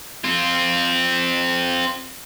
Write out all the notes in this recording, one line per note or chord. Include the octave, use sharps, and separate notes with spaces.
C4 F4